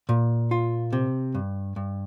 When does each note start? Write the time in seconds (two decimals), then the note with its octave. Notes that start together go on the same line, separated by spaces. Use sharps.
0.09 A#2
0.51 F4
0.93 C3
1.35 G2
1.76 G2